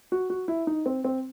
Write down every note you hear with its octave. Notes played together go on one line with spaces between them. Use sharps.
F#4
F#4
E4
D#4
C4
C4